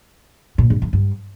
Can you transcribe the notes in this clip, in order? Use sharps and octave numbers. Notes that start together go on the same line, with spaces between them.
A#2
G2
F2
G2